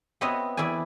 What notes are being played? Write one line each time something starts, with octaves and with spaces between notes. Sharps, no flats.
B3 C4 F#4 C#5 D#5 E5
E2 E4 D5 G#5